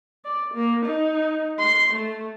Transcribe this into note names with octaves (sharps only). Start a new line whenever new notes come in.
D5
A#3
D#4
C6
A3